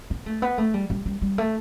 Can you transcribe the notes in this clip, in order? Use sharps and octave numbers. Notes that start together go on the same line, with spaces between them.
B3
A3
B3
A3
G3
G3
G3
G3
A3